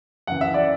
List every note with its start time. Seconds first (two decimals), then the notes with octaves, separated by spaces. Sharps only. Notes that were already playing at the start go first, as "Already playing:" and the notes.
0.27 F#2 E3 F#5
0.41 E5
0.54 D5